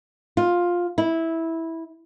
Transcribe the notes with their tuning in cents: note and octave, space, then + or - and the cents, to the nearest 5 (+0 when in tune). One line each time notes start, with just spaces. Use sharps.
F4 +10
E4 -10